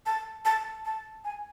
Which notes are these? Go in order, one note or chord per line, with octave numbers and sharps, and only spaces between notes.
A5
A5
A5
G#5